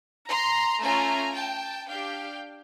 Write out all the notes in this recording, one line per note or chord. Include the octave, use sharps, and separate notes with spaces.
A#5 C6
A3 C#4 F4 G#5 A#5
G5 A5
D4 G4 F5 G5